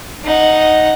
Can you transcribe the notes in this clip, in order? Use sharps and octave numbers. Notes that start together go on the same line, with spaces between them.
D#4 F#5